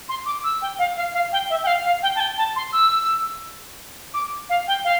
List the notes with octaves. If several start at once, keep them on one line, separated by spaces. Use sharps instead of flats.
C6
D6
E6
G5
F5
F5
F5
G5
E5
G5
F5
F5
G5
A5
G5
A5
C6
E6
D6
F5
G5
F5